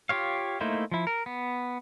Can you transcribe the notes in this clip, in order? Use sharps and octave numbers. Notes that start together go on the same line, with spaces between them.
F4 G4 C#5 F5
A3 A#3 D#4 E4 C5
F3 E4
A#4
B3